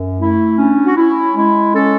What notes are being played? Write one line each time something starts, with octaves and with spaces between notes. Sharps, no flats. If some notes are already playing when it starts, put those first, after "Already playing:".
Already playing: F#2
A3 E4
C#4 D4
F#4
C#4 E4
G#3 E4
C#4 A4